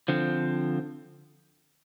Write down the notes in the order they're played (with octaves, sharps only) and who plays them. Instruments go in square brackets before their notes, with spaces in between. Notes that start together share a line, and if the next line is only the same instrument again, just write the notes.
[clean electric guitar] D3 F3 C4